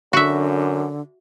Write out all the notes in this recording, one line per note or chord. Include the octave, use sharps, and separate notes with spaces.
F#2 D3 F#4 E5